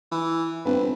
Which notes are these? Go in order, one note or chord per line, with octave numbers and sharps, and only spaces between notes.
E3
G1 C4 B4